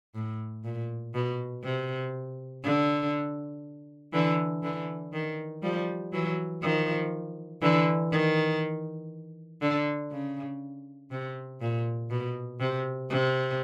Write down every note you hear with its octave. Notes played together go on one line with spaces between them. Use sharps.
A2
A#2
B2
C3
D3
D3 E3
D3 E3
D#3
F3 G3
E3 F#3
D#3 F3
D3 E3
D#3
D3
C#3
C3
A#2
B2
C3
C3